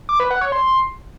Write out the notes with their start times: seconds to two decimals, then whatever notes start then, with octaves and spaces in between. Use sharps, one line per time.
0.09 D6
0.20 B4
0.31 F#5
0.41 C#5
0.52 C6